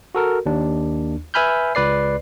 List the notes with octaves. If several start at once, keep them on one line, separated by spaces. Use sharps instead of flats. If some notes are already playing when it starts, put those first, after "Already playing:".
F#4 A4 A#4
D#2 D4
B4 E5 G#5 B5 F6 G6
C#2 B4 D5 C7